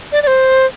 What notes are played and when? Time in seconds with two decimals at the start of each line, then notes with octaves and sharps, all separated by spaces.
0.12 D5
0.23 D5
0.27 C5